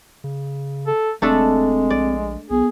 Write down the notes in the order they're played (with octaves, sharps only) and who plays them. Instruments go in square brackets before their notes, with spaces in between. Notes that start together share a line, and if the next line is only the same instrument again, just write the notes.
[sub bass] C#3
[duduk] A4
[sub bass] E1 [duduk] G#3 [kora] A3 D4 A4 [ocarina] C4
[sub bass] A#1 [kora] D5
[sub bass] B1 [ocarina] B3 [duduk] G#4